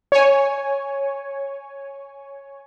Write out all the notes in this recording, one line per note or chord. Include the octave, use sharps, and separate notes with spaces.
C#5 G#5